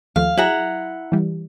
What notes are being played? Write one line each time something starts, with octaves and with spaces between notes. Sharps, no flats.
D#2 F3 A3 F5
F#3 E4 G#4 F#5 A#5
E3 G3